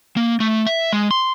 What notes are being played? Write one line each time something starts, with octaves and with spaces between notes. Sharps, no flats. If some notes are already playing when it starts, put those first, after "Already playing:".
A#3
A3
E5
G#3
C6